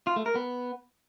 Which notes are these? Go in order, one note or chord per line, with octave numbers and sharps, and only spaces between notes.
F4
A3
A#4
B3